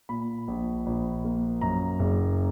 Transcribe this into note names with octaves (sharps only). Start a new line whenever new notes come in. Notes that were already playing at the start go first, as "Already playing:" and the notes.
A#2 B5
A#1
A#1
A#3
F#2 A#5
F#1